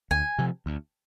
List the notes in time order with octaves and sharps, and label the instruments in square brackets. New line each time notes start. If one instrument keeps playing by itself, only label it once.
[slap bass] D2 [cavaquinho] G#5
[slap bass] C3 F3
D2